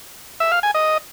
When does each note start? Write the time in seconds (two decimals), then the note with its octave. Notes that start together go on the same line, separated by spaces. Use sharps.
0.40 E5
0.52 F5
0.63 G#5
0.74 D#5